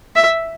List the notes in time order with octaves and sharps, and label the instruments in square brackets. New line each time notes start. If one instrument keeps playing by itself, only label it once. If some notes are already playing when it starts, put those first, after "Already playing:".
[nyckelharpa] E5